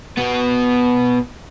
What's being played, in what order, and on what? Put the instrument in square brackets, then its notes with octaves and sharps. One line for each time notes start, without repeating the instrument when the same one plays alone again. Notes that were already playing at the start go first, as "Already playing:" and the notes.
[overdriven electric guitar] B2 B3